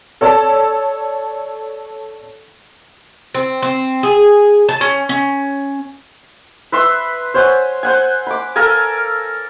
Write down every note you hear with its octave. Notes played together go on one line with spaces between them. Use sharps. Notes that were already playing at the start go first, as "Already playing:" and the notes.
A4 C#5 D5 A5 E6
C4
C4
G#4
A5
C#4
C#4
B4 E5 C6 E6
C5 C#5 F#5 G#5
C5 F#5 G#5
B5 D6
A4 A#4 F5 G#5